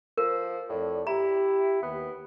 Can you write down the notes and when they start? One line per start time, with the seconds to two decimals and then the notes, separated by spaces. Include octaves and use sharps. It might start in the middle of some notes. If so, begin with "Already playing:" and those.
0.18 F3 A#4
0.70 F2 A2 A4 D5
1.07 E4 G4 A#5
1.82 D#2 B3